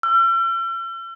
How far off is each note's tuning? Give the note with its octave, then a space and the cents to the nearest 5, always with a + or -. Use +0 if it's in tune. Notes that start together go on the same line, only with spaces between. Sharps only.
E6 +45